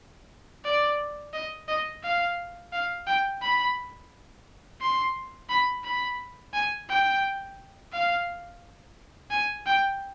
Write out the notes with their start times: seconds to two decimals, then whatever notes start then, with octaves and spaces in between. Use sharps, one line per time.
0.65 D5
1.33 D#5
1.68 D#5
2.04 F5
2.73 F5
3.07 G5
3.42 B5
4.81 C6
5.49 B5
5.84 B5
6.54 G#5
6.89 G5
7.93 F5
9.31 G#5
9.67 G5